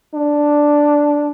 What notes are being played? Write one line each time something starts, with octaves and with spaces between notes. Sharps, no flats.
D4